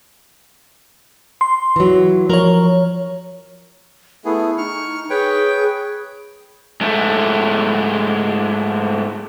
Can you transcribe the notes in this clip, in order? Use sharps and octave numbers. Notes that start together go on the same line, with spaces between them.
C6
E3 F#3
F3 A#4 C#5 A#5
A3 B3 E4 G#4
D#4 C#6 F6
G#4 B4 C#5 G5
G#2 A3